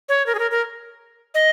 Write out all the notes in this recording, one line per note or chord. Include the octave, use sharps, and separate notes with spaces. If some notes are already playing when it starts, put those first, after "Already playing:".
C#5
A#4
G#4
A#4
A#4
D#5